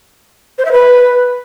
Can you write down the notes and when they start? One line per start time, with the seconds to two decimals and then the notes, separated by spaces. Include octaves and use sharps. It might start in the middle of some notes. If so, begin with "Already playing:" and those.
0.58 C5
0.65 E5
0.72 B4